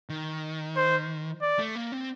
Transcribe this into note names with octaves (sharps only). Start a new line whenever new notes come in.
D#3
C5
D5
A3
A#3
C4